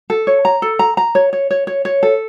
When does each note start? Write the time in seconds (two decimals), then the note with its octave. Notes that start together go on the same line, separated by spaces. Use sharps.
0.10 A4
0.27 C#5
0.45 A#5
0.62 A4
0.79 A#5
0.97 A#5
1.15 C#5
1.33 C#5
1.51 C#5
1.67 C#5
1.85 C#5
2.03 A4